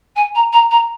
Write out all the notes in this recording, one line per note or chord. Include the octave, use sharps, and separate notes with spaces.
G#5
A#5
A#5
A#5